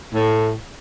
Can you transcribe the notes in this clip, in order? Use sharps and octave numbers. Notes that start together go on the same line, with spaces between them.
A2